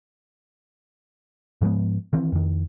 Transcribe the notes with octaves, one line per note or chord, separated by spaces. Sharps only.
G#2 F3 G#3 B3
D#3 E3 C4
F2 D#3